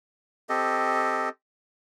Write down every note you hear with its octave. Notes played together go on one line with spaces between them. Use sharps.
C4 G4 A4 D#5